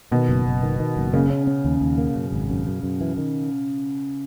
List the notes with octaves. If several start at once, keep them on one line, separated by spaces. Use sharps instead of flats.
B2 D#3
F#1
F#1
D#3
D#3
F#1
C#3 A#3
C#4
C#4
D#2
D#2
A#3
F#2
G#1
F#2
F#2
F#2
E3
D#3